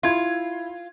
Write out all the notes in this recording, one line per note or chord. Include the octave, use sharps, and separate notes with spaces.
E4 F4 G#6